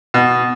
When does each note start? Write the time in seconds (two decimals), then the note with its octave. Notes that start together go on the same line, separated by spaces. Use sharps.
0.14 B2